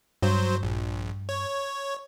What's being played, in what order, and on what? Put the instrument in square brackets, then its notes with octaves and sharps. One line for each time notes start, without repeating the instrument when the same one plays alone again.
[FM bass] G2 [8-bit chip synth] F#3 C5
[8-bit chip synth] A#1
C#5